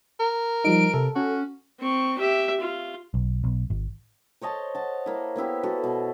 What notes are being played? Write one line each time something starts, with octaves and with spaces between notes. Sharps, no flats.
A#4
F3 G3 D#4 D7
C3 A4
C#4 F#4
C4 C#6
G4 E5
F4
B1
B1
G#1
C5 C#5 D#5 A5
F#5 A5
A#3 E4
A#3 B3 E4 G4
F#4 A4
B2